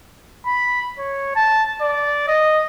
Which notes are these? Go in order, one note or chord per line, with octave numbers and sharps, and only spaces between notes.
B5
C#5
A5
D5
D#5